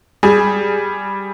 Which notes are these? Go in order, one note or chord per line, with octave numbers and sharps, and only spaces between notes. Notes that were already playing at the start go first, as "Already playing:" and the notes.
G3 G#4